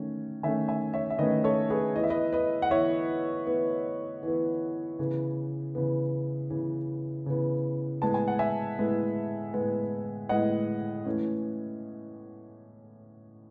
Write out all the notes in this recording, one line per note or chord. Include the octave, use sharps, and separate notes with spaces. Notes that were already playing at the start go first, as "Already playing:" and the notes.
Already playing: D#3 A3 C#4
D#3 A3 C#4 E5 G#5
E5 G#5
C#5 E5
E5
D#3 A3 C#4 B4 D#5
A4 C#5
G#4 B4
E3 B3 D#5
E5
B4 D#5
B4 D#5
F#5
E3 B3 C#5 E5
E3 B3
E3 B3
C#3 E3 B3
C#3 E3 B3
C#3 E3 B3
C#3 E3 B3
A2 G#3 B3 A5
G#5
F#5
E5 G#5
A2 G#3 B3
A2 G#3 B3
A2 G#3 B3 D#5 F#5
E3 A3 C#4